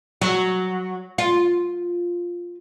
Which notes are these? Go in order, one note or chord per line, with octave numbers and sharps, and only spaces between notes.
F#3
F4